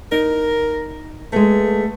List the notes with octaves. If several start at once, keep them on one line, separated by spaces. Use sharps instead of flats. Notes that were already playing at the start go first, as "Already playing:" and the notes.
D#4 A#4
G#3 A3 B3